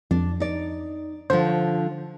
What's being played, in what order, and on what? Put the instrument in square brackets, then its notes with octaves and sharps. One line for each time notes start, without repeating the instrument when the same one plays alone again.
[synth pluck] F2 [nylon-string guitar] D4
[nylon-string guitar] D#4 D5
[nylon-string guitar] D3 F3 [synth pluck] C5